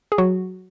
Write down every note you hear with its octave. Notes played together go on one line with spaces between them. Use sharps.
G#4
F#3 F#4